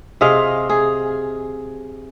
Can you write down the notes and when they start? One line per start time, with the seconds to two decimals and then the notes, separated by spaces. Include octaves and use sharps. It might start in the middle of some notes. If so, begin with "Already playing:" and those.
0.21 C3 G#4 D#5 F5
0.69 G#4